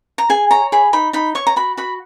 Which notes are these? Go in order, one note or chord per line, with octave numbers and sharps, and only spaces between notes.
A#5
G#4 G#5
C#5 A#5
G#4 B5
D#4 B5
D#4 B5
C#5 C#6
A#5
F#4 B5
F#4 B5